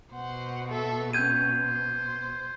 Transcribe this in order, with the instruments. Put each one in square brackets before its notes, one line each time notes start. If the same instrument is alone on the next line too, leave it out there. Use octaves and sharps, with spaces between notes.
[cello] B2 [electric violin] C5 F#5
[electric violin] A4 E5
[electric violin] C4 C#4 [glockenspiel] G6 G#6 D#7
[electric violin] C5